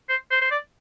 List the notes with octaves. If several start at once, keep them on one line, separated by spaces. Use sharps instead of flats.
C5
C5
C5
D5